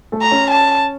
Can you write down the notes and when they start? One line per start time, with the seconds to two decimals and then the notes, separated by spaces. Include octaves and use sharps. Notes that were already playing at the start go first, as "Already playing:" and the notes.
0.12 A3 A4
0.22 A#5
0.31 C#4 C#5
0.51 A5